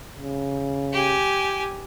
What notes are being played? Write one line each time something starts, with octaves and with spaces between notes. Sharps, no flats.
C#3
G4 G#5